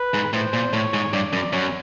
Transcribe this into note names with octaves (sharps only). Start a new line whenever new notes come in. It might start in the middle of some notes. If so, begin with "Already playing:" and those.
Already playing: B4
G#2
A2 C5
A#2
A2 C#5
G#2
G2 D5
F#2
F#2 C#5